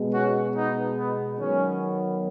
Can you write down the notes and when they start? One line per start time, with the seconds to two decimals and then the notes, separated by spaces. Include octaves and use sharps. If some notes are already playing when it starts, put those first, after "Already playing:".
Already playing: B2 G#3 B3
0.12 C#4 F#4
0.55 B3 D#4
0.98 B3
1.39 D#3 F#3 B3 C#4